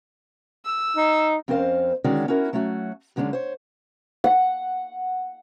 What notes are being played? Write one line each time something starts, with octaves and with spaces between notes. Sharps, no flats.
E6
D#4
F2 C4 C#4 A#4 C5 F5
D3 D#3 G#3 C#4 F#4 D5
C#4 E4 F#4 A#4 E5
F#3 A3 C#4 F#4
F#2 D3 G#3 B3 C#4 D4
C5 C#5
F#5